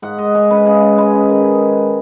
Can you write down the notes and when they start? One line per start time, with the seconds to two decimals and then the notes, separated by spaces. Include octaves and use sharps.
0.02 G#2 F#5
0.18 G#2 D#5
0.34 G#3 C#5
0.50 C#4 B4
0.66 C#3 G#4
0.82 C#3
0.98 G#3 B4
1.15 C#4
1.30 D#3